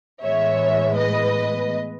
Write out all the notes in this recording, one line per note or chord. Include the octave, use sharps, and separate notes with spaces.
A2 E3 G#3 B3 C#5 E5
B4 D#5